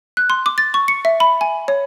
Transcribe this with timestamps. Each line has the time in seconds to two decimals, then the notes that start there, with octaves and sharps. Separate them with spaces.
0.17 F#6
0.30 C6
0.46 D6
0.58 A6
0.74 C#6
0.88 C#7
1.05 E5
1.20 B5
1.41 G#5
1.68 C#5